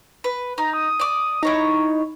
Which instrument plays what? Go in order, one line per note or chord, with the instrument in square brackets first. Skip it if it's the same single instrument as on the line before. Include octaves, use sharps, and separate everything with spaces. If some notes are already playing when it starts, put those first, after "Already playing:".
[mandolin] B4
[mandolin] D#4 [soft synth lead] A#5
[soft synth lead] D#6
[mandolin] D5 D6
[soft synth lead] D#4 [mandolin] E4 C#5 A#5